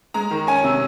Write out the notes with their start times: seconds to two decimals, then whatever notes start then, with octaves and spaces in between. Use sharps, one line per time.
0.14 G#3 A#5
0.31 D#3
0.47 C#4 G#5
0.64 C3